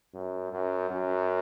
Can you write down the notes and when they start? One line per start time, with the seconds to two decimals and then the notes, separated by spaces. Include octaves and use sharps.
0.14 F#2
0.53 F#2
0.91 F#2